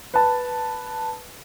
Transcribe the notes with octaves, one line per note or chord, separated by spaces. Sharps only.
B4 A5